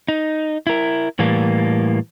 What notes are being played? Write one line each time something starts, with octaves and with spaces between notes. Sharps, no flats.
D#4
E4 A#4
A2 E3 G3 A#3